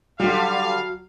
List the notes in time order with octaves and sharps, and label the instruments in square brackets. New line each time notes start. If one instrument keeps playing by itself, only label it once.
[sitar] D3 G3 [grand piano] F#3 [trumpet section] F5